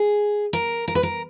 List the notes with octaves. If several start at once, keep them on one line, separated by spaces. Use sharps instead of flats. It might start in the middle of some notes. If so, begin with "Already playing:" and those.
Already playing: G#4
A#4
A#4
B4
A#4